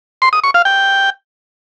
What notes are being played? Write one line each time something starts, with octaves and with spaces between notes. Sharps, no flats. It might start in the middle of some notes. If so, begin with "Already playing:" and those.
C6
D#6
C#6
F5
G5